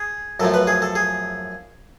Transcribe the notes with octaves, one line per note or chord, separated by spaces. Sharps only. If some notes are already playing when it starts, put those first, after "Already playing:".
Already playing: G#4
F#2 F3 A3 A4
B4
G#4
A4
G#4